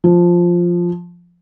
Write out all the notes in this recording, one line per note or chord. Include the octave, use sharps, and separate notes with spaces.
F3